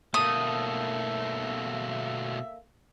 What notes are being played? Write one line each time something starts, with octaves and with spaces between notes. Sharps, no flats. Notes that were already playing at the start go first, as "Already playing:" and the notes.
B2 A3 A#3 A4 E5 D#6